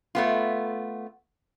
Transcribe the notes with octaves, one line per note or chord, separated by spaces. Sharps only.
A3 B3 F4